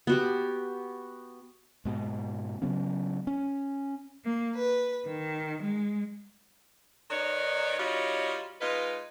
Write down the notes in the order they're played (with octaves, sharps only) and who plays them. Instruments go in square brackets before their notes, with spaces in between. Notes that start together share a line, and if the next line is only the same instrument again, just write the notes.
[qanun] B3 F#4 G4
[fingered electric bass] G#2 B2
C#3 F#3 B3 C#4
C#4
[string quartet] A#3
B4
D#3
G#3
[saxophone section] D#3 D#4 B4 C#5 D5
G3 D#4 F4 F#4 C#5
G#3 D#4 F4 B4